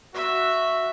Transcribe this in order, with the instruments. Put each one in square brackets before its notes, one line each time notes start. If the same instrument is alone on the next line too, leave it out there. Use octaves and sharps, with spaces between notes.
[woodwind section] F#4 [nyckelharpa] E5